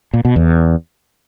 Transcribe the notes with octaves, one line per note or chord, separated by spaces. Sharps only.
A#2
B2
E2